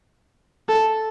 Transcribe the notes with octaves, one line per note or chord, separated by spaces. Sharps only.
A4